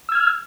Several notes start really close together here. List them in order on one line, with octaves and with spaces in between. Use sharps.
E6 G#6 F6